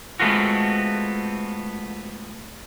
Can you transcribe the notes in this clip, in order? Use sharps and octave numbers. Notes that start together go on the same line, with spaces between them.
G#3 A3 B3 C4 F4 F#4